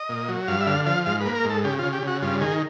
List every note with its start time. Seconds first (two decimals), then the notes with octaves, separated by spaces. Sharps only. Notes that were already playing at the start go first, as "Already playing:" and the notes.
Already playing: D#5
0.09 A#2
0.28 F#3
0.48 G2 F5
0.61 E5
0.66 D3 F5
0.86 F3 F5
1.06 G#2 F5
1.20 A#3 B4
1.35 A#4
1.45 G#2 A4
1.64 C#3 G4
1.79 C#3 F4
1.93 G4
2.03 C#3 F#4
2.22 G2 F4
2.41 D#3 G#4